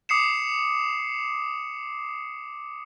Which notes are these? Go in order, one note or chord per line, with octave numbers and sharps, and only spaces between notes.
D6 D#6 C7 C#7 E7